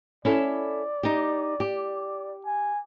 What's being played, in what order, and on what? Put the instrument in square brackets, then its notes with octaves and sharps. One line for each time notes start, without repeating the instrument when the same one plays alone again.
[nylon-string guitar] C#4 E4 A4 [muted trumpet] D5
[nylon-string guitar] D#4 G4
G4
[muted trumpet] G#5